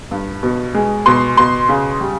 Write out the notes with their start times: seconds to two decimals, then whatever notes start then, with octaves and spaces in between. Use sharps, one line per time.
0.11 G2
0.43 B2
0.74 G#3
1.06 B2 C6
1.37 B2 C6
1.69 C#3
2.01 G3